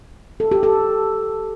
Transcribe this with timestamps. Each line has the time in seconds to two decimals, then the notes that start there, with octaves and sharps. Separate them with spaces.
0.40 A4
0.52 G4
0.63 A4